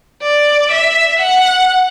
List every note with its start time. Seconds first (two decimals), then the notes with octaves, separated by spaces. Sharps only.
0.22 D5
0.72 E5
1.19 F#5